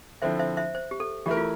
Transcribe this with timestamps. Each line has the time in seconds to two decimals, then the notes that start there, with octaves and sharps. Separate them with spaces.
0.22 D3 F3 C4 E4 C5 E5
0.39 C5 E5
0.57 C5 E5
0.75 C5
0.91 G4
1.00 A4
1.26 E3 A3 E4 G4 A#4
1.37 F4